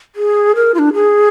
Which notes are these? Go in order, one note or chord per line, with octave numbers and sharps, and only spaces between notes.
G#4
A#4
F4
D4
G#4